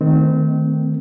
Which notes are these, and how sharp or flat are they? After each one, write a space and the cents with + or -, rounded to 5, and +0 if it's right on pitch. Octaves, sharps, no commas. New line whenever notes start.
D#3 +0 A3 +0 C4 -25